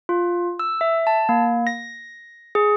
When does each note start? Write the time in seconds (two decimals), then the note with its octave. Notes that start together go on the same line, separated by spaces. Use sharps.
0.09 F4
0.59 E6
0.81 E5
1.07 A5
1.29 A#3
1.67 A#6
2.55 G#4